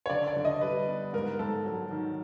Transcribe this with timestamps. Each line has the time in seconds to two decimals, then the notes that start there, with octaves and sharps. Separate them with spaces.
0.06 C#5
0.10 D3 D5
0.28 D5
0.36 D3
0.45 D#5
0.61 G3 B4
0.88 B3
1.13 G#2 A#4
1.39 G#2 A4
1.65 F#3
1.91 D#3